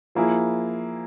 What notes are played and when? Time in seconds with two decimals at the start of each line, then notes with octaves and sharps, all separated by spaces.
0.15 F3 A#3 E4 G#4